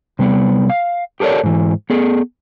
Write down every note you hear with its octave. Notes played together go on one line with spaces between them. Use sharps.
C3 G3 B3
F5
G4 A4 A#4 C#5 D5
G#2 E3
B3 G#4 A4